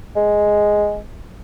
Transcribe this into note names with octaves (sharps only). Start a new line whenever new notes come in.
G#3